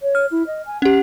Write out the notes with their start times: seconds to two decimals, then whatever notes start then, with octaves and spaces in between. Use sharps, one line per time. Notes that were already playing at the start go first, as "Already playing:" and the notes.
0.02 C#5
0.15 F6
0.31 E4
0.47 D#5
0.66 G#5
0.82 C#4 G4 F#5